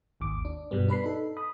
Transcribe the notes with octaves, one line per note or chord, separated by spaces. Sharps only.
G#1 D#2 D6
D4
G2 B2 G3 B3
D4 B4 B5 C7
D#4 A4
B5 D#6